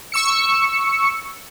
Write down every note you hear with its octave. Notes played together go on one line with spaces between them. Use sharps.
C#6 E6 C#7